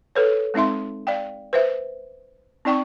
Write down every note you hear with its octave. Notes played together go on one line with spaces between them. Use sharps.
A4 B4 C#5
G#3 C4 D#4 E5 C6
D5 F5 G5
B4 C5 E5
C4 D#4 D5 G5 C#6